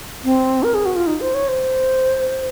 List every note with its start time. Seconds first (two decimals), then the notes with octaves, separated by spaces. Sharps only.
0.24 C4
0.63 A#4
0.74 G#4
0.85 F#4
0.96 F4
1.07 D#4
1.21 C5
1.34 C#5
1.48 C5